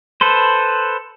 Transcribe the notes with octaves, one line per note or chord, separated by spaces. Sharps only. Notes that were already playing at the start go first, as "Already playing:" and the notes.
A4 B4 C5